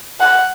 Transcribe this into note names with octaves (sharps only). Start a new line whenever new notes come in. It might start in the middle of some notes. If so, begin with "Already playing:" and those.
F#5